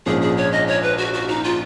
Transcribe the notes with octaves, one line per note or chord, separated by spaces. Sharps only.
A#1 G#2 F3 A#3 C#4 G#4
G#4
C#5
D#5
C#5
B4
F#4
F#4
D#4
F4